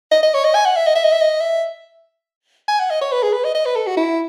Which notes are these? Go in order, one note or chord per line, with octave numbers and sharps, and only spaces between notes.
D#5
D#5
C#5
D#5
G#5
F#5
E5
D#5
E5
D#5
E5
D#5
E5
G#5
F#5
D#5
C#5
B4
G#4
B4
D#5
D#5
B4
A4
F#4
E4